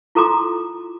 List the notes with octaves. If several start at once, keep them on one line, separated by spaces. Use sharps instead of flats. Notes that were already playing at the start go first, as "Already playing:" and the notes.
E4 F4 A4 A#5 C6 D6